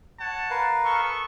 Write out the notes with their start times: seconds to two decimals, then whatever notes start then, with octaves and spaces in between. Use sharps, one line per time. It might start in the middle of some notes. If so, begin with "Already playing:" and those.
0.19 C#5 F#5 A5
0.50 A#4 B4 F5
0.84 B3 A4 C#6